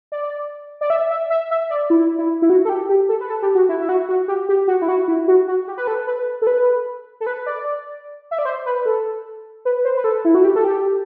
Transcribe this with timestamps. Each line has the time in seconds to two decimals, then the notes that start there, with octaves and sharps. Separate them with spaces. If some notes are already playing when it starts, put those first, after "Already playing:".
0.12 D5
0.81 D5
0.90 E5
1.10 E5
1.30 E5
1.51 E5
1.70 D5
1.90 E4
2.18 E4
2.42 E4
2.50 F#4
2.65 A4
2.69 G4
2.89 G4
3.09 A4
3.21 B4
3.30 A4
3.43 G4
3.55 F#4
3.69 E4
3.81 E4
3.89 F#4
4.09 F#4
4.28 G4
4.49 G4
4.68 F#4
4.82 E4
4.89 F#4
5.08 E4
5.28 F#4
5.48 F#4
5.68 G4
5.78 B4
5.87 A4
6.07 B4
6.42 A4
6.47 B4
7.21 A4
7.27 B4
7.46 D5
8.31 E5
8.39 D5
8.45 C5
8.66 B4
8.86 A4
9.65 B4
9.85 C5
9.97 B4
10.04 A4
10.25 E4
10.35 F#4
10.44 G4
10.55 A4
10.65 G4